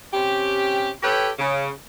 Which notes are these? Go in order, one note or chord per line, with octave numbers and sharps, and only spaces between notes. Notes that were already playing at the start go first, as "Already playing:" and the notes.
C3 C#4 G4
G4 A4 B4 C#5 G5
C#3